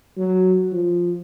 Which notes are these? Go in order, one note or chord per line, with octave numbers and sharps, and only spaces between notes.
F#3
F3